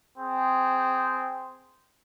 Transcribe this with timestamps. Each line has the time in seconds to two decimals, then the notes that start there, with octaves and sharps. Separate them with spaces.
0.18 C4 G#4